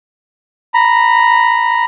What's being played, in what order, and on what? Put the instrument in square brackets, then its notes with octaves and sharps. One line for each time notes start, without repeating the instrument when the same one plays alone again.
[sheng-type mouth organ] A#5 B5